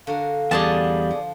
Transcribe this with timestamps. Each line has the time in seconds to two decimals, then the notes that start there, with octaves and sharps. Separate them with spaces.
0.07 D3 F#4 A#4 F5
0.51 E2 G3 F#4 G#4 D5 A5
1.11 F3